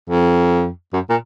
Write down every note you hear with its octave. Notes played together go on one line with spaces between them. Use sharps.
F2
F#2
A#2